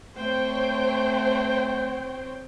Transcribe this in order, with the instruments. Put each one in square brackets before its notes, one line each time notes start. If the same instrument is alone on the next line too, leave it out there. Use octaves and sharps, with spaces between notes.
[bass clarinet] A3 [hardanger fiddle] C4 [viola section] C5 C#5 G5